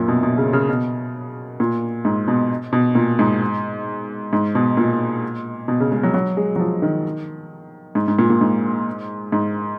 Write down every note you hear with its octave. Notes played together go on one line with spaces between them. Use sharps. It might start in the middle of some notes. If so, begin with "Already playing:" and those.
Already playing: F#2 A#2
B2
B2
C#3
C#3
B2
A#2
G#2
B2
B2
A#2
G#2
G#2
B2
A#2
B2
C#3
G#3
F#3
F#3
G#3
F#3
F3
D#3
G#2
G#2
A#2
A#2
G#2
G#2